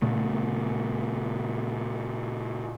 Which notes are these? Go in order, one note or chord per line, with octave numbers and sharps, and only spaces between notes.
A#2 C#3 A3